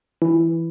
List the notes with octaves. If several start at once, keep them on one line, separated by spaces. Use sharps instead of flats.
E3